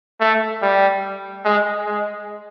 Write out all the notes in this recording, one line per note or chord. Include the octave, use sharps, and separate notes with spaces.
A3
G3
G#3
G#3